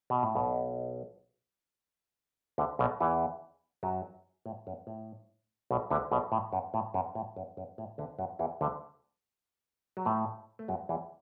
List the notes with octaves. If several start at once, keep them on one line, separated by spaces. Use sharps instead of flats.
B2
A2
B1 B2
D2 D3
B1 B2
E2 E3
F#2 F#3
A2
F#2
A2
B1 B2
D2 D3
B1 B2
A2
F#2
A2
F#2
A2
F#2
F#2
A2
D2 D3
F#2 F#3
E2 E3
D2 D3
F#3
A2 A3
A3
F#2 F#3
E2 E3